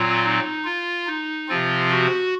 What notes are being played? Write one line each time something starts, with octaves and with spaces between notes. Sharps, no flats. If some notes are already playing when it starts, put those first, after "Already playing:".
Already playing: A#2 F#3 C4 F4
D#4
F4
D#4
C3 F3 C4 F4
F#4